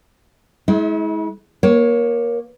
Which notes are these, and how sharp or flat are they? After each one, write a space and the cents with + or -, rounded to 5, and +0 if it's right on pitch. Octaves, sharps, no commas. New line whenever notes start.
G#3 +30 E4 -35
A#3 +20 C#5 +0